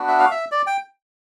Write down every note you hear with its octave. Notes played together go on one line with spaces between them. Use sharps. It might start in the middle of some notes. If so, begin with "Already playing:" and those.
Already playing: B3 D4 F#4
E5
F5
E5
D5
G5